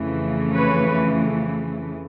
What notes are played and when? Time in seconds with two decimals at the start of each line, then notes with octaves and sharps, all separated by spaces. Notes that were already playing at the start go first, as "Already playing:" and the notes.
Already playing: F2 C#3 E3 A3
0.52 B4 C#5